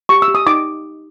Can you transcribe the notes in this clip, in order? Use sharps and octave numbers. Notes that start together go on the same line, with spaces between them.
G4 C#6
E6
G4
D#6
D#4 D6